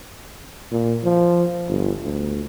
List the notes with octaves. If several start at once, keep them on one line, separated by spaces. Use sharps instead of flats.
A#2
F3
G1
D2